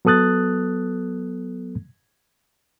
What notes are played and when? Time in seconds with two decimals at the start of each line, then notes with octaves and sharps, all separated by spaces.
0.05 F#3 B3 A4 D#6 F#6 A6